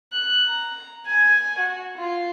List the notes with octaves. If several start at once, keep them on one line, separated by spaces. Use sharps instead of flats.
F#6
A#5
G#5
F#4
F4